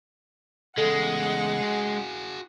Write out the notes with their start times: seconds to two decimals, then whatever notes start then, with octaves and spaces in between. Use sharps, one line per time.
0.78 E2 C#3 G#3 A4 F#5
1.63 F#4 G#4